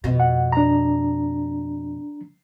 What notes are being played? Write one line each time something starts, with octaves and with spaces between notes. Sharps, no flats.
F2 B2
F#5
D4 A#5